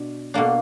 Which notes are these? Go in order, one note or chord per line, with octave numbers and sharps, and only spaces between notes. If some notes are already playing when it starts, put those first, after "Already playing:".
Already playing: B2 D4
B2 A#3 D4